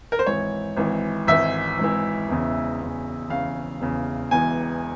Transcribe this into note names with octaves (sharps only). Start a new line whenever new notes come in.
A#4
C5
G#1 G#2 E3 C#5
G#1 G#2 E3
G#1 G#2 E3 E5
G#1 G#2 E3
E1 E2 C#3
E1 E2 C#3
E1 E2 C#3 F5
E1 E2 C#3
E1 E2 E3 G#5